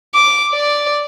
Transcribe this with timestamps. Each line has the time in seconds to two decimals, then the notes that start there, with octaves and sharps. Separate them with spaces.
0.15 D6
0.54 D5